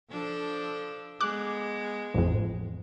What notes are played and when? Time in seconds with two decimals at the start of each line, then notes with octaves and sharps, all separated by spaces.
0.10 F3 D4 A4
1.21 G#3 B3 D6 F#6
2.14 A1 F2